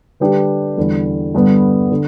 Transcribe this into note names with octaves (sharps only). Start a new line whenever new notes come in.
D3 G3 D4 G4 B4
E2 D3 G3
G2 D3 G3 B3
D3